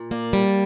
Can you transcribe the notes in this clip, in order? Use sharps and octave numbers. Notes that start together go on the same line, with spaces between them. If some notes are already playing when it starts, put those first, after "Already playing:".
Already playing: A#2
A#3 D5
G3